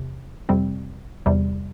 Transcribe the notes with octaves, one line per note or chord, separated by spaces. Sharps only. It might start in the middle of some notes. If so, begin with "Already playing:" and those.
Already playing: E2 C3
F2 C3 G3 C4
E2 C3 G3